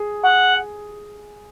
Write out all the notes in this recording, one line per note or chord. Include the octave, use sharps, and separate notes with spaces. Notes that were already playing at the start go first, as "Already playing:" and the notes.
Already playing: G#4
F#5